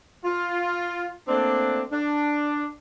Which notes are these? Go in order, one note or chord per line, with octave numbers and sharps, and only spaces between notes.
F4
A3 A#3 C4 D4
D4